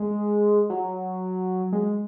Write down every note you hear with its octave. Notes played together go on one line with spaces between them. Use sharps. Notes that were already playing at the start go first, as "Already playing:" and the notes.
Already playing: G#3
F#3
G#3